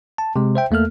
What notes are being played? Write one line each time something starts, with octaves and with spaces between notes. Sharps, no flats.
A5
C3 G#3
C5 E5 G5
E2 A3 A#3 A4 F6